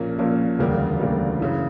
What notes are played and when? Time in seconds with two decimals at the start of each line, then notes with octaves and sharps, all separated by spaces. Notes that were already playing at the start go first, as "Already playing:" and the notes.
Already playing: A#1 A#2 A#3 C#4
0.19 A#1 A#2 A#3 C#4
0.59 E1 D2 C#3 G3 A#3
1.00 E1 D2 C#3 G3 A#3
1.40 F#2 C#3 E3